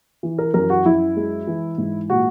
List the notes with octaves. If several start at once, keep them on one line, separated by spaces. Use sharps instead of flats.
E3
A#4
F#2 A#4
F#4
F#2 E4
G#3
E3
G#2
A#2 F#4